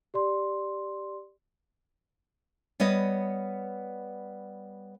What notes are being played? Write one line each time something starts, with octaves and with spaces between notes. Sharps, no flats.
G4 D5 C6
G3 B3 B4 C#5 D#5